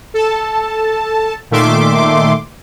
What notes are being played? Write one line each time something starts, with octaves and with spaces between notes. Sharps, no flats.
A4 A5
A#2 D#3 A3 E5 C6 D6